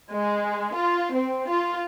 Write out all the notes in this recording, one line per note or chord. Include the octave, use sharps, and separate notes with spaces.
G#3
F4
C4
F4